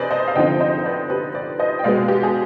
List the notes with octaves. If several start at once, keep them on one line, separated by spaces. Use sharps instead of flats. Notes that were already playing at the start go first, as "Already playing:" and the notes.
Already playing: C3 G#4 B4 C5 D5 D#5
C5 D#5
F5
D3 F3 C4 D#4 D#5 G5
C5 D#5
C5
B4 D5
G4 B4
B4 D5
C5 D#5
G5
B2 G#3 B3 D5 F5
G4
G#4